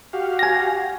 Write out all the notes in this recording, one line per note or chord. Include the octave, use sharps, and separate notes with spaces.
F#4 G4 F5
G#5 A#6